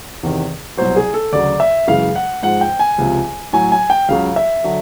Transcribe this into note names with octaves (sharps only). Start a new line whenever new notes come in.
E2 C3 D#3
C2 B2 F#3 C5
G#4
A4
D2 C#3 F#3 D5
E5
F#2 C#3 E3 G#3 F5
F#5
G#2 F3 G#3 F#5
G5
G#5
C#2 C3 F3
A2 F#3 G#5
G#5
G5
C#2 C#3 F#3 F5
E5
D3 F#3